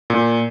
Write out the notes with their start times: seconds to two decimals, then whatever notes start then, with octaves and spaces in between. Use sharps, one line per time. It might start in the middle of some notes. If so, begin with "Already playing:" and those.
0.10 A#2